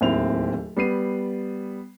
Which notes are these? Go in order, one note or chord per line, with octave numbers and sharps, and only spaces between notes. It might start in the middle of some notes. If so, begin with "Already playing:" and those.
D1 D#2 C4 E4 F7
G3 B3 C7 D#7